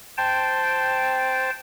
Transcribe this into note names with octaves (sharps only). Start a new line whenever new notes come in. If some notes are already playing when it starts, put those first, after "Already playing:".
C5 G5 A5